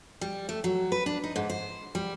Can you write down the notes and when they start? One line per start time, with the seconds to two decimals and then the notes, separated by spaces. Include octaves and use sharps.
0.21 G3
0.49 A3
0.64 F#3
0.92 B4
1.06 D4
1.24 D#4
1.36 G#2
1.50 C5
1.95 G3